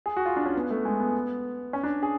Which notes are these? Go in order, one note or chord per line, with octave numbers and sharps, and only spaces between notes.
G#4
F#4
F4
D4
C#4
B3
A3
G#3
B3
C#4
D4
G#4